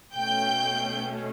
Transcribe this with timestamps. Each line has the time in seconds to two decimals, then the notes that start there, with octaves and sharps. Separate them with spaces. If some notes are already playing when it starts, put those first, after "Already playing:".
0.15 B2 A3 C#4 G5 G6